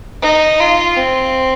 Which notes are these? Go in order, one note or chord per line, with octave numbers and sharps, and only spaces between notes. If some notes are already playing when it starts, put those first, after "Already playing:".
D#4
F4
C4